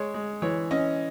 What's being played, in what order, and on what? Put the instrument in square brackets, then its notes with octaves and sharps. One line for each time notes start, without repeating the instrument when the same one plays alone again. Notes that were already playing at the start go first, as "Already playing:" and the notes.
Already playing: [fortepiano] G#3 C#5
G#3
E3 C#5
C#4 D#5